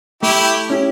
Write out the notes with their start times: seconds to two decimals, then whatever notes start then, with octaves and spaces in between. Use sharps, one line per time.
0.23 A3 E4 G4
0.70 C#4 E4 G4